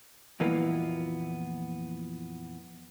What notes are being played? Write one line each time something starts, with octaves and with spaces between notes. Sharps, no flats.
F2 A#2 E3 A#3 B3